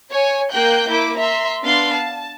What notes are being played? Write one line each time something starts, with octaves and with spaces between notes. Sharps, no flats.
C#5 G#5
A#3 G5 F#6 G6
A#3 E4 D6
E5 A#5 C6
B3 D4 F5 C6
A5